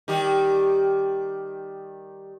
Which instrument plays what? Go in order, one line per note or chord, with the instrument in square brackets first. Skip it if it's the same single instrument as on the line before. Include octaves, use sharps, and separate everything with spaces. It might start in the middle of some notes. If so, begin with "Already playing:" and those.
[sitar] D#3 G3 G4